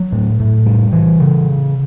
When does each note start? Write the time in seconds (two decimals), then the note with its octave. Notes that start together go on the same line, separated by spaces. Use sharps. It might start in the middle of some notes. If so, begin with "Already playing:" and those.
Already playing: F#3
0.12 A2
0.40 A2
0.66 G3
0.93 E3
1.20 C#3